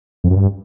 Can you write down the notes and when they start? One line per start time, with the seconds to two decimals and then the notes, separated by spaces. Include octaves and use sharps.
0.24 F2
0.30 F#2
0.36 G2